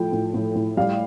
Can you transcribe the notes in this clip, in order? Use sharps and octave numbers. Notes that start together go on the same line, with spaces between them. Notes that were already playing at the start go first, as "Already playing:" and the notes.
Already playing: A2 F3 A3 G5
A2
A2
A2
G3 F5